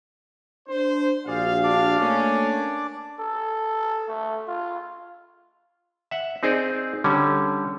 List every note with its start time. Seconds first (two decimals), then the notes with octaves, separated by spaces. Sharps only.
0.68 D4 C5
1.27 A#1 F#4 G#4 D5 F5
1.64 D4 D5 D6
1.99 A3 A#3 C#4
3.20 A4
4.09 A3
4.48 F4
6.11 E5 F#5
6.43 C4 D#4 G#4 C5 D5
7.04 D3 G3 C#4